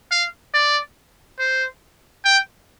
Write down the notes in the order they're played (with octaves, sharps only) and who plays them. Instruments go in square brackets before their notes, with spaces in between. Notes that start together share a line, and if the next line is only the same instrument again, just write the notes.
[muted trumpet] F5
D5
C5
G5